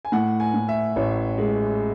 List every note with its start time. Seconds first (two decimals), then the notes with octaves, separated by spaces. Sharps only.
0.05 G#5
0.12 A2 F#5
0.40 G#5
0.54 A2
0.69 E5
0.96 A1 C#5
1.38 G#3